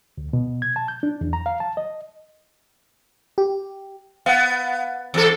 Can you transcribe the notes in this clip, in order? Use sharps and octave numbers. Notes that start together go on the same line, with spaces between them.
D2
B2
G#6
A5
G6
D4
E2
A#5
F5
A5
D#5
G4
B3 F5 F#5
E2 A4